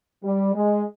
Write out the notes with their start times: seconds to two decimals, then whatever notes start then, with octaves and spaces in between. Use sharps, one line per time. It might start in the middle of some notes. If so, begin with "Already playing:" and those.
0.24 G3
0.55 G#3